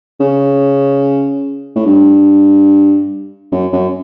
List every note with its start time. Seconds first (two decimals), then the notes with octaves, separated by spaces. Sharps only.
0.20 C#3
1.76 A2
1.85 G2
3.52 F#2
3.73 F#2